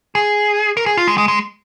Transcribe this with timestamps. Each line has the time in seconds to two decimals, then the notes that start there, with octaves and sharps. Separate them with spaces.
0.15 G#4
0.77 A#4
0.86 G#4
0.97 F4
1.08 G#3
1.18 G#3
1.28 G#3